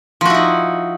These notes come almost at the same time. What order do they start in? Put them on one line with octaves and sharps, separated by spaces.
F3 F#4 E4 D#4